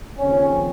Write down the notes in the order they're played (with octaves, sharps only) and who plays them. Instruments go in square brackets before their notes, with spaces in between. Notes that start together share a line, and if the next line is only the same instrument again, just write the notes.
[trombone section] D#2 C#3 F3 C4 C#4